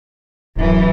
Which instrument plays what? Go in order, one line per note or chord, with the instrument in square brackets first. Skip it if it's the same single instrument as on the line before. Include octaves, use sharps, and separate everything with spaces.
[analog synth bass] D1 [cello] F#2 E3